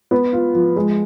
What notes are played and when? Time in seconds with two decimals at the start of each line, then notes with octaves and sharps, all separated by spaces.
0.11 B3
0.33 F4
0.55 F3
0.76 G#3